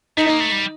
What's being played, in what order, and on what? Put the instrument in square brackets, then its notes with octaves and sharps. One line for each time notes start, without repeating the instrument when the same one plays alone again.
[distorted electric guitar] A3 [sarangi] D#4
[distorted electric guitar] A#3
A3
G3